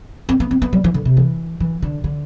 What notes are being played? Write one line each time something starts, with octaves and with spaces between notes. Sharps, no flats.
C4
B3
C4
B3
G3
E3
D3
C3
E3
E3
D3
D3